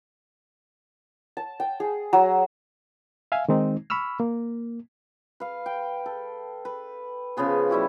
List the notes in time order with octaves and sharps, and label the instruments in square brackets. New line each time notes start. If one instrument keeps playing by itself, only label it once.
[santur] A5
G5
G#4
F#3
[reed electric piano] E5 F5 G#5
D#3 G#3 C4 D#4
B5 C#6 E6 F6
A#3
[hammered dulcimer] B4 F5
G5
A4
B4
C#3 F3 B3 G#4
G3 E4 F#4 G4